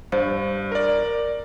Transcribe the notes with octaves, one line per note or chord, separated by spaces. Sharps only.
G2 C5
A#4 D5